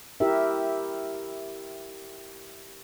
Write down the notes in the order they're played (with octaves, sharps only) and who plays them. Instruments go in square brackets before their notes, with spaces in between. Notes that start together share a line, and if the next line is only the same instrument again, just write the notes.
[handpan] E4 G4 A#4 E5